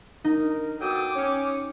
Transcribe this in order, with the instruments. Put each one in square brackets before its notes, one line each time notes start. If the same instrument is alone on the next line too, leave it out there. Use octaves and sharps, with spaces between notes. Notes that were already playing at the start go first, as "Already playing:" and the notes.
[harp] D#4 [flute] A#4
[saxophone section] B2 F#3 A4 [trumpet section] G5 D#6 [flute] D6
[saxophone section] C#4